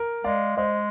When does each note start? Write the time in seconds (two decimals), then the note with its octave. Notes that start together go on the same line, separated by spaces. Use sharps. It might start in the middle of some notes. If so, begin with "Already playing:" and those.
Already playing: A#4
0.24 G#3 D5 F5
0.57 G#3 C5 D#5